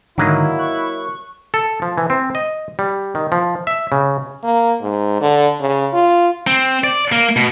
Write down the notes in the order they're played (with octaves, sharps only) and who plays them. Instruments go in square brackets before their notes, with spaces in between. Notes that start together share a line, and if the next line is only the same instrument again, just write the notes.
[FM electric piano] G#2 D3 D#3 [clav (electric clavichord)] F#3 A#3 D#5 [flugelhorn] E4
[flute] C#6 [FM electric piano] F#6
[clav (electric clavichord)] A4
F3
E3
C4
D#5
G3
D#3
F3
E5
C#3
[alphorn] A#3
G#2
D3
C#3
F4
[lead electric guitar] C4
D5
A#3
B2